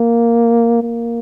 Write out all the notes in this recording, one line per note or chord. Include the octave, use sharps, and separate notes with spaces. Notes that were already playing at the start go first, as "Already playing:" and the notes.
Already playing: A#3
A#3